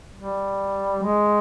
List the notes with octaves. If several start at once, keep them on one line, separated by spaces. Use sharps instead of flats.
G3
G#3